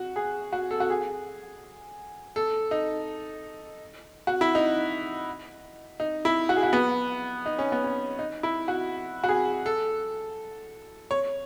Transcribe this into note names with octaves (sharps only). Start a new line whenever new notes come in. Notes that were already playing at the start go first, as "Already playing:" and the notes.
Already playing: F#4
G#4
F#4
A4
F#4
G#4
A4
D#4
F#4
E4
D#4
D#4
E4
F#4
G#4
F#4
B3
D#4
C#4
B3
C#4
D#4
E4
F#4
F#4
G#4
A4
C#5